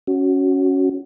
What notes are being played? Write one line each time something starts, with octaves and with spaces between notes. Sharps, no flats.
C#4 F#4